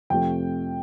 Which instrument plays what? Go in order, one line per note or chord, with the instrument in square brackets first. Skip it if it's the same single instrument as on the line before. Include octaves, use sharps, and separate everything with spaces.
[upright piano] F2 C3 F3 A3 G5